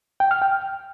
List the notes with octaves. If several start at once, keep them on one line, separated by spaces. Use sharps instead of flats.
G5
F6
G5